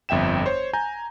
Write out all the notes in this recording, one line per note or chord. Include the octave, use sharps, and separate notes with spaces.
G1 F2 E5 G5 E7
C5 C#5
G#5 A#5 G6